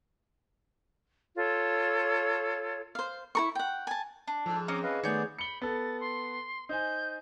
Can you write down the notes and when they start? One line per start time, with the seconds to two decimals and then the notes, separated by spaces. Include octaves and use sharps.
1.35 F4 A4 C#5
2.95 C5 F5
3.35 E4 A#4 C#6
3.55 F#5 G5
3.87 G#5 A5
4.27 D4
4.46 G#2 F3 A4
4.68 C4 C#4 A#5 D6 D#6
4.83 B4 D#5 F5
5.04 D#3 A3 B3 G#4 C#5 D5 G6
5.39 B5 C#7 G7
5.62 B3 A4 A6
6.00 C6
6.69 D#4 C5 G#5 G6